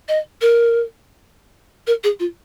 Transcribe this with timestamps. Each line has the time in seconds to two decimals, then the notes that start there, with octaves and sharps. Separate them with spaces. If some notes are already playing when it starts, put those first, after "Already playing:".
0.08 D#5
0.41 A#4
1.87 A#4
2.04 G#4
2.19 F4